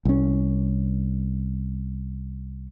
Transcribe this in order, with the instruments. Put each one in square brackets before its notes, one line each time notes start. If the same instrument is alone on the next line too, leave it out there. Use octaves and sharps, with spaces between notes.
[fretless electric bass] C2 C#4